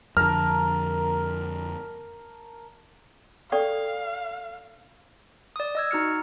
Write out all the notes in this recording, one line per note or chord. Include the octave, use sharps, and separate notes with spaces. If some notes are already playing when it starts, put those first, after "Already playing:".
F2 D3 A#4 A5 F6
A4 D5 F5 G5
D5 D#6
D#5 E6 G#6
D#4 F#4 F6 C#7